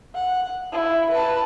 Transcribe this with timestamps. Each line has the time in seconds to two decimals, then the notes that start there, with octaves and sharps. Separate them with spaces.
0.15 F#5
0.72 E4
1.11 B4 A5